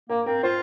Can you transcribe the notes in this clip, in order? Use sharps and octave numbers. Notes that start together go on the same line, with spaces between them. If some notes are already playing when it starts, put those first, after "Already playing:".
A#3 A#4
C4 A#4
F4 C5